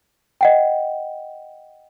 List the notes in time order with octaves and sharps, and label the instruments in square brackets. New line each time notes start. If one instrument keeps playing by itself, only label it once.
[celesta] D#5 F#5 G5